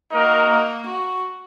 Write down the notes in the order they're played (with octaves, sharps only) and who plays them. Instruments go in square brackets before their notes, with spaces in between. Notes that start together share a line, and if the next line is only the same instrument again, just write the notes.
[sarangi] A#3 [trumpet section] D#4 F#4 A#4
[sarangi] A#3
F#4